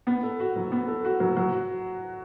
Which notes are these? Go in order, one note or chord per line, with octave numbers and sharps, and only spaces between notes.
B3
A4
F#4
F#3
B3
A4
F#4
F#3
F#3
F#4